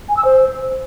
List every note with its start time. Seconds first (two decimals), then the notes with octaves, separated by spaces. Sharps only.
0.09 G#5
0.17 E6
0.25 C5